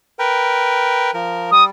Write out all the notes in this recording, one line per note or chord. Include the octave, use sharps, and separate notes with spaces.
A#4 B4 G5
F3 A#4
G3 D#6